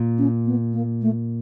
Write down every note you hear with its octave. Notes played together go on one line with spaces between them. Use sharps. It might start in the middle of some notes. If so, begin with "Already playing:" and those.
Already playing: A#2
C#4
B3
A#3
A3